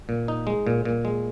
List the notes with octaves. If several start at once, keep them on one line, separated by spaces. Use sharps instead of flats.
A#2
D#4
G#3
A#2
A#2
G#3